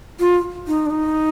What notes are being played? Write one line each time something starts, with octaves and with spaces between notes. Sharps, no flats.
F4
D#4
D4
D#4